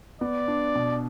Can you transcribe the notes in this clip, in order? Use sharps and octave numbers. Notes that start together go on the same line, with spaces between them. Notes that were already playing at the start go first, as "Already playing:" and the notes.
B3 D5
D4
B2